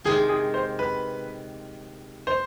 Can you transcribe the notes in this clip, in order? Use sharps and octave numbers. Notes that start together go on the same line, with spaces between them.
C3 D#3 G#3 C4 G#4
G#4
C5
B4
C5